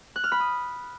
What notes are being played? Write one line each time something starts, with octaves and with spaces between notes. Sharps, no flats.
F#6
F6
B5
D#6